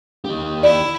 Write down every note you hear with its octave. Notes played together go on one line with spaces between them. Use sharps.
D#3 G4
E4 D5